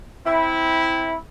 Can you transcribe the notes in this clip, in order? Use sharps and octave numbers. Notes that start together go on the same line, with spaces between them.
C4 E4